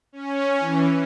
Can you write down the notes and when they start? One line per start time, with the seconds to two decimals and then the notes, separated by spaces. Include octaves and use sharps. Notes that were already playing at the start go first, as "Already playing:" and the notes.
0.12 C#4
0.60 E3